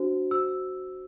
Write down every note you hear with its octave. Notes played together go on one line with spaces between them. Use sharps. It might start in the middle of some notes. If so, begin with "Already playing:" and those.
Already playing: D4 F#4 C5
F#4 C5 E6